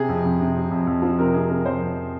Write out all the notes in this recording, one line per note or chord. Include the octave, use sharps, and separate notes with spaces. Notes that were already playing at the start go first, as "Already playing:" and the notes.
Already playing: C3 G#4
F2
F2
C3
C3
F2
F2
F3
C3 A#4
C3 G#4
C3 A#4
F2 C5
F2